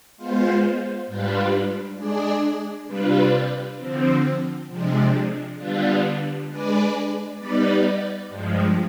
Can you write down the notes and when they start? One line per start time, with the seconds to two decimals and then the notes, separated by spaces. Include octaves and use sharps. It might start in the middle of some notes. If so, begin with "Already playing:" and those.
0.17 G#3 B3 F4 C5
1.06 G#2 G3 D4 F4 B4
1.97 G#3 D4 G#4 D5
2.87 C3 G3 D4 F4 B4
3.77 D3 F3 C4
4.68 C3 F3 G#3 D4
5.57 D3 G3 B3 D4 F4
6.48 G#3 D4 G#4 B4 D5
7.38 G3 B3 D#4 B4 D5
8.29 G2 F3 G#3